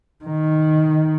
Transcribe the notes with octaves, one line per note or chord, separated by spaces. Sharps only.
D#3